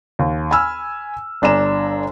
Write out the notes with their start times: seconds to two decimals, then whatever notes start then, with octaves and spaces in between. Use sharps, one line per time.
0.19 D#2
0.51 G#5 B5 E6 F6
1.42 G1 D4 G#5 A#5 E7